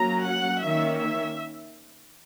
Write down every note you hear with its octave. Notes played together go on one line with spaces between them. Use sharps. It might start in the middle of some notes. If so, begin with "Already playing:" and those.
Already playing: F#3 A#3 C#4 A#5
F#5
D#3 A#3 C#4 E5
E5